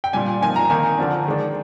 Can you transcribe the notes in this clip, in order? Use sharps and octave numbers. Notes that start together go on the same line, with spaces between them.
G5
A#2 G3 D4 G#5
F3 A#3 D#4 G#5
A#5
D#3 A#3 D#4 G#5
D3 F3 A#3 D4
D#3 G#3 D4